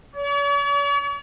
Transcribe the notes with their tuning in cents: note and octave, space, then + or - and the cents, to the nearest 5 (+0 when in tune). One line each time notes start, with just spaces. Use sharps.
C#5 +45